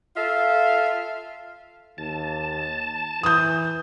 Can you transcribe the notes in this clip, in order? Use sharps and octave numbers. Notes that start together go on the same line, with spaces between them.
F4 A4 E5 F5
D#2 A5
E3 D#6 G6